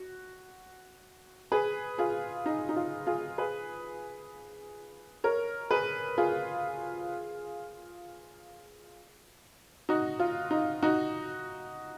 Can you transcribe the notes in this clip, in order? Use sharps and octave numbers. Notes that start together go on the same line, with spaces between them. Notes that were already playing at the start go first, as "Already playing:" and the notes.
Already playing: F#4
G#4 B4
F4 G#4
D#4
D#4
F4
F4 G#4
G#4 B4
A#4 C#5
G#4 B4
F4 G#4
D#4 F#4
F4
D#4
D#4 F#4